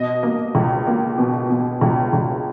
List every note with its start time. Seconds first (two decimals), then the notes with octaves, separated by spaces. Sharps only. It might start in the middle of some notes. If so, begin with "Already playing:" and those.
Already playing: B2 D#5
0.23 A#3
0.55 C#2
0.87 A#3
1.18 B2
1.50 B2
1.81 C#2
2.13 C#2